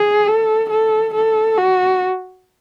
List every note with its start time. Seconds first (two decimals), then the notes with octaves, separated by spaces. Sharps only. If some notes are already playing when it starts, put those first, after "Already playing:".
Already playing: G#4
0.27 A4
0.70 A4
1.14 A4
1.58 F#4